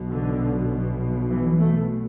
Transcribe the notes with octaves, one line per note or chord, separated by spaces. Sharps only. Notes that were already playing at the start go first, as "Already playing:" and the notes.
Already playing: B1 B2
D3
E3
A3